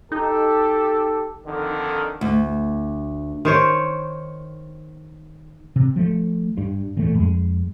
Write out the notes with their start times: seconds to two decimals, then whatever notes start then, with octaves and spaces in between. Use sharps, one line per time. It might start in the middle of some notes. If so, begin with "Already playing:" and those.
0.12 D#4 G4 A4
1.46 F2 D3 D#3
2.21 D2
3.45 D#3 C5 C#5
5.76 C3
5.96 F3 A3
6.58 G2
6.96 D#1 E2 A#2 A3
7.15 F2 G#3